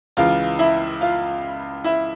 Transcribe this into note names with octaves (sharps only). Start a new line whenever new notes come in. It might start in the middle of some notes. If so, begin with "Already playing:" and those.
C#2 C#3 E3 F4 F5
E4 E5
F4 F5
E4 E5